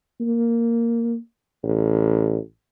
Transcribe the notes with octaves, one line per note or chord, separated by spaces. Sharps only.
A#3
A1